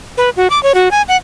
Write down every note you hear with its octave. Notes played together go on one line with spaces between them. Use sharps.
B4
F#4
D6
C#5
F#4
G#5
F#5